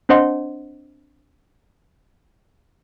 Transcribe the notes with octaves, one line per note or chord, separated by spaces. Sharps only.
C4 D4 C5 D#5 F#5 C6